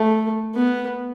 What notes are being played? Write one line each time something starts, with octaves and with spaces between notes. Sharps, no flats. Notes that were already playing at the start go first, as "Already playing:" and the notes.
Already playing: A3
B3